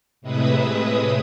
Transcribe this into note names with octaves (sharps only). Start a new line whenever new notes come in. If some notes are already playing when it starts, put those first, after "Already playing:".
A2 C3 G#3 B4 E5 D#6